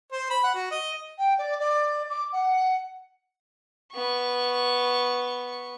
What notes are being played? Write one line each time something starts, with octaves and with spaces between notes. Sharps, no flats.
C5
B5
F#5
F#4
D#5
G5
D5
D5
D6
F#5
B3 C#6